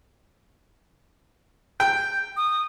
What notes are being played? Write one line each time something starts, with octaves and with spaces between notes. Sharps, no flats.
G5 G6
D#6